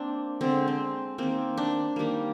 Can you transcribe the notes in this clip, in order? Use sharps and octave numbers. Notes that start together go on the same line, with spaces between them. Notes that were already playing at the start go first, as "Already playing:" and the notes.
Already playing: A#3 C4 D4
D3 G#3 C4
C4
D#3 A#3 C4
D4
D#3 G3 A#3